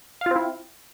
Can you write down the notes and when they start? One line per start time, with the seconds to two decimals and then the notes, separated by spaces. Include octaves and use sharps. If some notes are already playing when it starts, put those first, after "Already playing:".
0.21 F5
0.26 F4
0.31 C4
0.36 E4